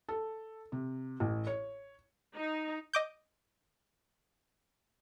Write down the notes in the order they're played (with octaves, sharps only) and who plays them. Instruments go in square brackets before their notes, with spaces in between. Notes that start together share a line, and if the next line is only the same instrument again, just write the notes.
[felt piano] A4
C3
A1
C#5
[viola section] D#4
[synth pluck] D#5 D6 G6